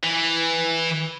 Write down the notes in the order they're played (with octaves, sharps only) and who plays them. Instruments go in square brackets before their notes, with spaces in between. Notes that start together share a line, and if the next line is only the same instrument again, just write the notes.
[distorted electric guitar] E3